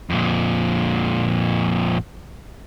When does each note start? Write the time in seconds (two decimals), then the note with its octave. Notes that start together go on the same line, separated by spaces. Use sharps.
0.10 F2 A#2